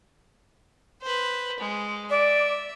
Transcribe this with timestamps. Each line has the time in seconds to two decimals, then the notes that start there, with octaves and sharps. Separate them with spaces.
1.02 B4 C5
1.60 G#3
2.10 D5 E5